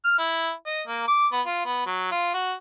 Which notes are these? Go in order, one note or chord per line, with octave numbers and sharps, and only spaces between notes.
F6
E4
D#5
A#3
D6
B3
F4
B3
F#3
F4
F#4